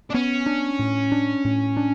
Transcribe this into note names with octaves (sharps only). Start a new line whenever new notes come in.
D4
B3 C#4
D4
A2
D4
A2
D4